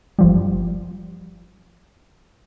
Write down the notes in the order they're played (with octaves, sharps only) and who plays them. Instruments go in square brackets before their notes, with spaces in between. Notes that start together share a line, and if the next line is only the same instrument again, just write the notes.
[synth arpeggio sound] G1 F3 G3